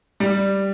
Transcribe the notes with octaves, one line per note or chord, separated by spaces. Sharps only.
G3